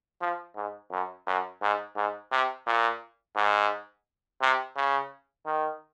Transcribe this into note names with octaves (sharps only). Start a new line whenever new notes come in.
F3
G#2
F#2
F#2
G#2
G#2
C3
A#2
G#2
C3
C#3
D#3